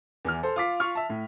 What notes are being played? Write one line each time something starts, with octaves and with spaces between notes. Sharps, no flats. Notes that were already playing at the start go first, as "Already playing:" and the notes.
E2 E3 F6
A4 C5
F4 D6 B6
F4 C#6 F6
E5 A5
A2